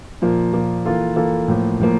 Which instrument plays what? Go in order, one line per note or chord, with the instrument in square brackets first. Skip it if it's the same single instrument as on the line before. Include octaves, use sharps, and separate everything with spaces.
[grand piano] A#2 F3 A#3
A#2 F3 A#3
E3 A#3 F4 A4
E3 A#3 F4 A4
A2 F3 A#3
A2 F3 A#3